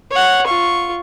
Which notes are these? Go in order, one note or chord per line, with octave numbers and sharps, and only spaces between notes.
C#5 F#5
F4 C#6